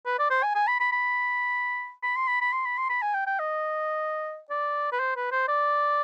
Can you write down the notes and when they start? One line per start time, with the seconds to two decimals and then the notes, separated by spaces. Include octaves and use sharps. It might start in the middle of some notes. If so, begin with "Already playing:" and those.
0.06 B4
0.19 D5
0.30 C5
0.43 G#5
0.55 G#5
0.68 B5
0.80 B5
0.92 B5
2.03 B5
2.16 C6
2.28 B5
2.41 B5
2.53 C6
2.66 B5
2.78 C6
2.90 B5
3.02 G#5
3.14 G5
3.27 G5
3.40 D#5
4.50 D5
4.92 B4
5.00 C5
5.16 B4
5.32 C5
5.49 D5